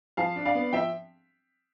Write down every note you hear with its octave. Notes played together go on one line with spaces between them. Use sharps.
F3 F5 A5
D4
D5 F5
B3
F3 E5 G5